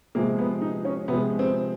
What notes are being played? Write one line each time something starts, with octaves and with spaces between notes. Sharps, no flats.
C3 F3 G#3 A#3
B3
D#4
C#4
C3 F3 G#3 B3
C4